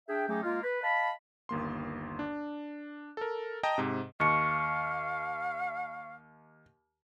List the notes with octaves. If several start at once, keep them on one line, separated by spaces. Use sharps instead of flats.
D4 G#4 E5 G5
F#3 A3 C#4 D#4 G4 G#4
G#3 A#3 F4
B4
D#5 F5 A5 B5
G1 D#2 A#3 C6
D4
A4 A#4
D#5 G5 A5 A#5
G#2 C3
D#2 F5 C#6 C#7